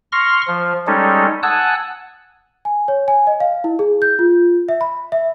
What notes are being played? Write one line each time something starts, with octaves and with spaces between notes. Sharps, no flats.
C6 C#6 F6 A#6
F3
G3 G#3 C#4 D#4 A4
F#5 G#5 A5 D#6 E6 F#6
G#5
C#5
G#5
D#5
F5
E4
G#4
G6
F4
E5
B5
E5